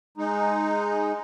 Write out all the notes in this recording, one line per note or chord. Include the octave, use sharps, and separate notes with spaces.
G#3 D#4